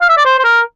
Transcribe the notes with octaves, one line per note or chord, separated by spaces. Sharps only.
F5
E5
D5
C5
C5
A#4